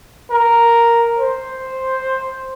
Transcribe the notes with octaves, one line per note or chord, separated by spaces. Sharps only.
A#4
C5